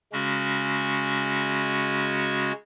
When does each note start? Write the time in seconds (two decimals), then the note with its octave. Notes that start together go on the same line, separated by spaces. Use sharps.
0.12 C#3 G#3 C#4 F#4